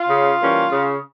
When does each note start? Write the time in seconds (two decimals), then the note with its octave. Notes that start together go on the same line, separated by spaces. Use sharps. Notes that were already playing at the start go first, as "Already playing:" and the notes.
Already playing: F4
0.09 C#3
0.40 E3 G3 A#3 C#4
0.71 C#3